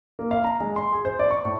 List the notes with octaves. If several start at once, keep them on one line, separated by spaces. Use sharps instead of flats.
A#3
F5
A#5
G#3
C6
G#4
C5
D5
C#6
A2